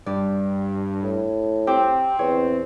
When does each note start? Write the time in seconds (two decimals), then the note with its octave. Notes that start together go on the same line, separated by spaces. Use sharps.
0.06 G2 D5
1.03 A2
1.67 C4 G4
2.19 E2 C#5